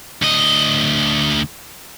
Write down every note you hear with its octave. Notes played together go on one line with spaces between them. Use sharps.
D2 D#5